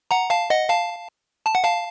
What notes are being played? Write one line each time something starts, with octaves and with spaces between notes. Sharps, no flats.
F#5 A#5
F5 A5
D#5 F#5
F5 A5
A5
F#5
F5 A5